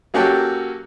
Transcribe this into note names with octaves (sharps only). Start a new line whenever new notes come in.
F#3 A#3 C#4 F#4 G4 A4